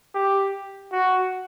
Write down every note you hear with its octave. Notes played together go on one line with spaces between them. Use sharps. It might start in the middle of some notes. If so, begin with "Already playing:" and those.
G4
F#4